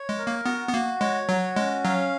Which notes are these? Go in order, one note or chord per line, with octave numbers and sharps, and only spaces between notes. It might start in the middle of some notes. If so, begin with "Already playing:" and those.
Already playing: C#5
G#3
A#4
A#3
B3 F#4
B3
A#3 F#4
G#3 C#5
F#3 F#4
G#3 C#4
F#3 F5